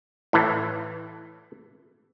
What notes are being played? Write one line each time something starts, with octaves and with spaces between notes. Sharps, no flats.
A2 E3